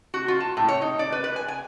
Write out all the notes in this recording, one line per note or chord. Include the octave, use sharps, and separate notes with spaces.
F#4
F4
A5
A2
C#5
D#4
D5
B4
B4
G#5
G#5